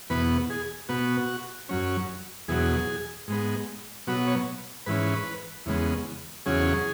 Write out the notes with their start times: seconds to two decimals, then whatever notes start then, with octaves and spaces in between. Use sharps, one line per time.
0.10 E2 B2 B3 B4
0.50 G#4
0.89 B2 B3 F#4
1.69 F#2 F#3 C#4
2.48 E2 B2 F#3 G#4
3.28 G#2 G#3 B3
4.07 B2 F#3 B3 F#4
4.27 C#5
4.86 G#2 E3 C#4 B4
5.66 E2 C#3 G#3 B3
6.46 E2 C#3 F#3 C#4 G#4